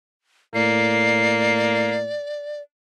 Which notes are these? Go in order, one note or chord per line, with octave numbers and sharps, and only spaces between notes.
A2 A#3 D5 C7